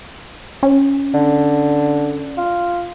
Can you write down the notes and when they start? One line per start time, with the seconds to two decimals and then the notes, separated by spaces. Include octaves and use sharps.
0.63 C#4
1.14 D3
2.38 F4